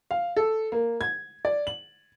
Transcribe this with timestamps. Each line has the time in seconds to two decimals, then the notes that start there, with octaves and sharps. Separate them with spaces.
0.11 F5
0.36 A4
0.72 A#3
1.01 G#6
1.45 D5
1.67 F#7